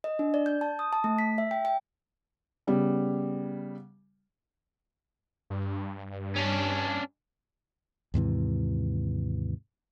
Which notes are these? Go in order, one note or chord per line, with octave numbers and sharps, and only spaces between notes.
D#5
D4
D5
G6
A5
D#6
A5
A3
B6
E5
G5
G5
C#3 G3 B3
G2
C#4 D4
D#2 G#2 C3 E3